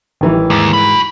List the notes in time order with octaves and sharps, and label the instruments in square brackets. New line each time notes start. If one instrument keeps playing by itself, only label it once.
[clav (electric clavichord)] A1 A#5 [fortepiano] D#3 E3 G3
[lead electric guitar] D#2 [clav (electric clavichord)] G#2
[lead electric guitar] F#4 B5